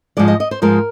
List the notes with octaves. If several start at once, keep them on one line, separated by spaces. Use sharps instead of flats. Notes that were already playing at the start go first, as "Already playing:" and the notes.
G#2 F3 G#3 D5
D#5
D#5
C5
G#2 F3 G#3 A#4